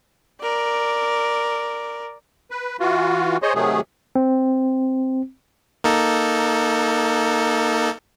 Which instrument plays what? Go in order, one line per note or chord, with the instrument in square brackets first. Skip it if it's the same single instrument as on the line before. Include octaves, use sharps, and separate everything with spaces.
[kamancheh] A#4 D5
[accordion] B4
E3 F4 F#4
G#4 C5 C#5 D#5
C3 D#3 F#3 A3 G#4
[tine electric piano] C4
[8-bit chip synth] A#3 D#4 A4